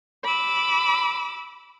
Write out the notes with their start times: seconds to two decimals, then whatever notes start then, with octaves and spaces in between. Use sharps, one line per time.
0.24 B5 D6 E6